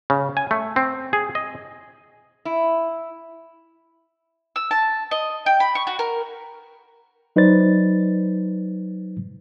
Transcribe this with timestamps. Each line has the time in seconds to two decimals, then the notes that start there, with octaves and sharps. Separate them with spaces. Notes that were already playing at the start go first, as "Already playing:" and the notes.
0.10 C#3
0.37 G#5
0.51 A3
0.76 C4
1.13 G#4
1.35 D#5
2.45 E4
4.56 E6
4.71 A5
5.11 D#5
5.46 G5
5.60 B5
5.75 C#6
5.87 F#4
5.99 A#4
7.36 F#3 D#4 B4 C5 D5 A6